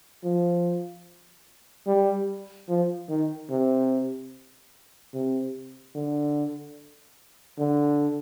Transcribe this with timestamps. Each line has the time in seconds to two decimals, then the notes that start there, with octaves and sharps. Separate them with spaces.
0.23 F3
1.87 G3
2.69 F3
3.09 D#3
3.50 C3
5.14 C3
5.95 D3
7.59 D3